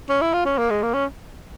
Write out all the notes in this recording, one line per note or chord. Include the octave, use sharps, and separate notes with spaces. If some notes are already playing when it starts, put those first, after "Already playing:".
C#4
E4
F4
C#4
A#3
G#3
A#3
C#4